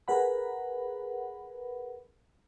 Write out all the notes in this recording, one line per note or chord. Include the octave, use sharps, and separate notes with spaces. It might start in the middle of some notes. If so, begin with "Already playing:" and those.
G#4 A#4 B4 F#5 B5